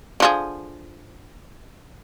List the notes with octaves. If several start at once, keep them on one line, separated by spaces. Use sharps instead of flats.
D3 F3 G#4